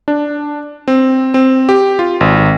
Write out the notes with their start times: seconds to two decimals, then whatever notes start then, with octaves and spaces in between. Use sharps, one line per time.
0.08 D4
0.88 C4
1.34 C4
1.69 G4
1.99 F4
2.21 G#1